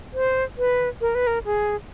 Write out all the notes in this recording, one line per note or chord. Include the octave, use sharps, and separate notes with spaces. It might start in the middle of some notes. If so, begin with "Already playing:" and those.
C5
B4
A#4
B4
A#4
G#4